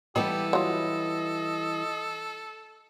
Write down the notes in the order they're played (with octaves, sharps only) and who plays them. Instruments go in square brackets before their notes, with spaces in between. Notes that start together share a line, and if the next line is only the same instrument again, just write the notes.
[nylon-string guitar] E3 G3 B3 [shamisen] D#4 [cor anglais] G4 [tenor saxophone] A4
[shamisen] F#3 F4 [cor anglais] D#5